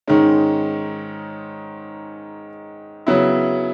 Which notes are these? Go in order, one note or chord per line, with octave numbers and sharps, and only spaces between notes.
G#2 D#3 G#3 C#4
C#3 F#3 B3 E4